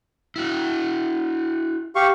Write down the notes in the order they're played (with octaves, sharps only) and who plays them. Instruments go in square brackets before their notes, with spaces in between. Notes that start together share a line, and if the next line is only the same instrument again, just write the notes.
[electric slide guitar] E4 F#4
[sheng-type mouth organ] G4 F5 C#6